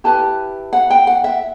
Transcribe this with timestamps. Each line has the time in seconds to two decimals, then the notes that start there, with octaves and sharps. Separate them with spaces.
0.04 E4 G4 B4 A5
0.73 F#5
0.90 G5
1.07 F#5
1.24 E5